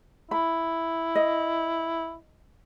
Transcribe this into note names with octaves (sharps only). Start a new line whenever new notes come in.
E4 B5
D#5